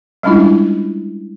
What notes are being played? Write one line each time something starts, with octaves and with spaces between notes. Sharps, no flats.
G3 G#3 C#4 D4 E4 F4